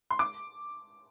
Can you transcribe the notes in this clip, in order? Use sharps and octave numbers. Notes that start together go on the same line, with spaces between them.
C6
D6